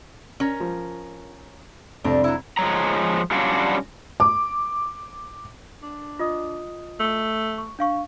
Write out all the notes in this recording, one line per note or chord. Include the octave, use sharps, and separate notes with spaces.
C#4 A#4
F3
C2 F2 D4
F#3 E4
F3 G#3 B4 C#5 A#5
F#3 G3 C#4 D4 F4 F#4
D6
D4
F4 D#5 D#6
A3
C#6
D4 F5 C#6